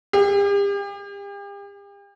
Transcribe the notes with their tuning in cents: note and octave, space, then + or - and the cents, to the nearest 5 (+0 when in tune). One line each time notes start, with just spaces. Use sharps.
G4 +40